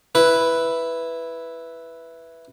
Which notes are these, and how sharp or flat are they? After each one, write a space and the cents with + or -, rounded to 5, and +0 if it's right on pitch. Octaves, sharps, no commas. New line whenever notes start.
E4 +0 B4 +0